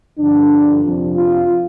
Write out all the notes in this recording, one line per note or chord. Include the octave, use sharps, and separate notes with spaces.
G2 D3 F3 D4
F2 C3 F3
F4